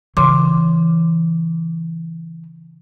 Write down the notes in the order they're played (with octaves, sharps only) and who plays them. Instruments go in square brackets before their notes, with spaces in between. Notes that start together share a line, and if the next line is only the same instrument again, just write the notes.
[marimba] C#3 C6 D6 [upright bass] E3